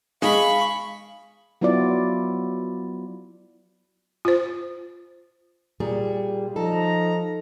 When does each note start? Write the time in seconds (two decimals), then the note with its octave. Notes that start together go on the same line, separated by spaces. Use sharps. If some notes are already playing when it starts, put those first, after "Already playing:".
0.22 G#3 F5 B5 C#6
1.61 F#3 B3 E4 F4 D5
4.25 F4 C5
5.80 A#2 G3 G#4
6.56 F3 D#4 A4 A#5